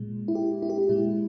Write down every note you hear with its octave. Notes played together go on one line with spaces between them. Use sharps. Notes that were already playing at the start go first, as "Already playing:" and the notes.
Already playing: A#2 G#3
E4
G4
E4
G4
E4
A#2 G#3 E4